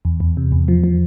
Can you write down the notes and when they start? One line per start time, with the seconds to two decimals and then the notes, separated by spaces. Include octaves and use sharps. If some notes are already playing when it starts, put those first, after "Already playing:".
0.05 E2
0.20 E2
0.37 C3
0.52 E2
0.68 F3
0.84 F3